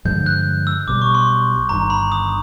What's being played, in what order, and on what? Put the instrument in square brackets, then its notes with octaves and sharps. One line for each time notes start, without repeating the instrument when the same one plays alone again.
[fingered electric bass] G2 D3 F3 G#3 [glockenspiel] G6
[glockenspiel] F#6
E6
[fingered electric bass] B1 B2 G3 [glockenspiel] D6
[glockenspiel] C#6
C6
[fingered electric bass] G1 G2 D#3 [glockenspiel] A#5
[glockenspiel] B5
D#6